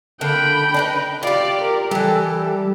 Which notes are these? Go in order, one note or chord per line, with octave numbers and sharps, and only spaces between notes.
D3 A#3 G5 B5
D4 D#4 B4
F4 G4 D5
A#4
E3 G3 G4 A4